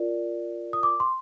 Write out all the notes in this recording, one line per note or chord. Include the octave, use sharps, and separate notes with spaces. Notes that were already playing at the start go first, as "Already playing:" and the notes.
Already playing: F4 A#4 D5
D#6
D6
C6